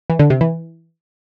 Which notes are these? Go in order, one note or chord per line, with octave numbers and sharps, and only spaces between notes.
E3
D3
C3
E3